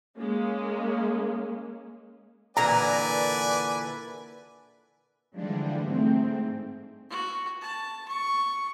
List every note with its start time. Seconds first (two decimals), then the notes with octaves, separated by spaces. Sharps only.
0.17 G#3 A#3 C#4
2.57 A#2 D3 E3 B4 D5 G#5 A#5
5.36 D3 E3 F3 G3 G#3 D4
5.84 G#2 G#3 A3 C4
7.10 F#4
7.61 A5
8.08 C#6